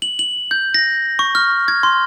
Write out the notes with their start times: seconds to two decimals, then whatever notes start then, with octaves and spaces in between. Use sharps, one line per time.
0.02 F#7
0.19 F#7
0.51 G6
0.74 A#6
1.19 C#6
1.35 F6
1.68 G#6
1.83 C6